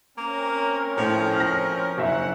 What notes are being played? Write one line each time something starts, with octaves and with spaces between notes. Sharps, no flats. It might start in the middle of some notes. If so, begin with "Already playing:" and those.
A#3 C4 C#4 A#4
A2 F3
F6 A#6
F#1 E5 F#5